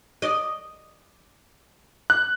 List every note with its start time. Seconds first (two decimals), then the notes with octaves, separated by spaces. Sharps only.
0.22 D5 D#5
2.10 F#6